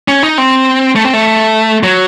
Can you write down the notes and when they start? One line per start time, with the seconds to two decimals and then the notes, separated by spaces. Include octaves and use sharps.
0.08 C#4
0.23 D#4
0.38 C4
0.96 A3
1.04 C4
1.13 A3
1.83 F#3